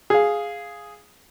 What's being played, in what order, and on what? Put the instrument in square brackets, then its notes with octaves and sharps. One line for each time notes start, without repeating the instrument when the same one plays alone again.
[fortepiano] G#4 F5